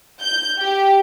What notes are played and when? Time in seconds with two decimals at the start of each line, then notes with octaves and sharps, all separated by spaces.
0.21 G6
0.60 G4